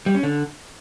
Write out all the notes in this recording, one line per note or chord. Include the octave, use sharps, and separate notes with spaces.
G3
C#4
D3